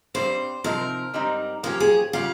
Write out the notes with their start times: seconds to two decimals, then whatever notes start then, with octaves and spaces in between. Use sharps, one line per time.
0.14 G2 G3 C4 C5
0.64 C3 F3 C4 D#4 A#4
1.14 G#2 G3 C4 D#4
1.63 F3 A#3 C#4 G4 A#4
1.80 G#4
2.13 C#3 G3 F4